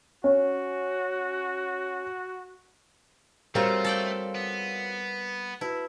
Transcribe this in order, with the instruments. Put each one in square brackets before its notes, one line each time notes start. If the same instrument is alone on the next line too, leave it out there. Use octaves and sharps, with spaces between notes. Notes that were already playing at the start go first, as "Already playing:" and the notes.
[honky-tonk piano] C#4 [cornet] F#4
[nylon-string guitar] G3 A#4 [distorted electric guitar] A3 [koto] C4 F4 [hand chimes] F#4 C#5 F5
[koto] A4 D5 G5
[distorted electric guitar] B3
[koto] E4 [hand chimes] F#4 B4 A5